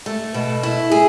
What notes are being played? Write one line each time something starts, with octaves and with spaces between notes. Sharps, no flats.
A3
B2
E4
G#4